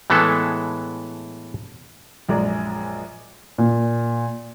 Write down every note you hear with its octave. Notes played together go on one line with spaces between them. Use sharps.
A2 E3 G#3 B3 A4
A#1 F#2 G#3 D5 A#5
A#2